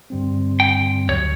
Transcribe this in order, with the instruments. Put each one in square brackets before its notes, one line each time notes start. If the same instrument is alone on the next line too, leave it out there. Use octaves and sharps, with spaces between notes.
[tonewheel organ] G2 D3 G3 C4
[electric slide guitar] G5
[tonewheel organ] D2 D3 F#3 [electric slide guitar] C#5